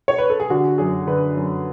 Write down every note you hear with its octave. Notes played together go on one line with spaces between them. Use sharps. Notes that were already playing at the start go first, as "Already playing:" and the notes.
C#5
B4
A4
G#4
D3 F#4
F#2 G#4
D3 B4
F#2